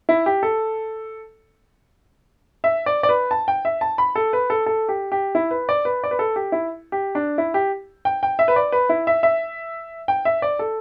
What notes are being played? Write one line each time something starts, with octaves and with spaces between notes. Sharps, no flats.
E4
G4
A4
E5
D5
D5
B4
A5
G5
E5
A5
B5
A4
B4
A4
A4
G4
G4
E4
B4
D5
B4
D5
B4
A4
G4
E4
G4
D4
E4
G4
G5
G5
E5
B4
D5
B4
E4
E5
E5
G5
E5
D5
A4